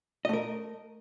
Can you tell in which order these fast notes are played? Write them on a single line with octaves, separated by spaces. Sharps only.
D#5 A3 A#4